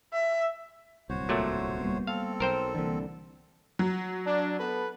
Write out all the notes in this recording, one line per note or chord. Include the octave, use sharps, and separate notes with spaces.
E5
D1 C2 F#4 C5 C#5
A#2 F#3 A3
G3 A#3 B3
C4 A4 F5
B1 A#4 C5 G5
C2 D3 E3 A#3
F#3
D4
B3 A4 B4